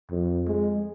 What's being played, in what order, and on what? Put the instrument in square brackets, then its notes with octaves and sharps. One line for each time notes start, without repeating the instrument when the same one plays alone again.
[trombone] F2
G#3